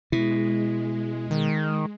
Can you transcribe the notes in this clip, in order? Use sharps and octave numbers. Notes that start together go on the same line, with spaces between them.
B2 G#3 E4
D#3